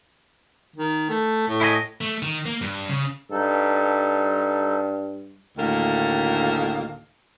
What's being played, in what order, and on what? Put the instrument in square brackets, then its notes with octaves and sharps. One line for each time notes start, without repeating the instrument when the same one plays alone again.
[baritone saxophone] D#3
A3
A2
[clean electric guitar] E4 G#4 D#5
[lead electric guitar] A3
D#3
A#3
G2
C#3
[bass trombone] G2 [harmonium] D#4 A4
[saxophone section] D2 A2 D#3 A#3 A4 F5